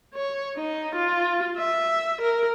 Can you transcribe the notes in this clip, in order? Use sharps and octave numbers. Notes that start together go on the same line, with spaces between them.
C#5
D#4
F4
E5
A#4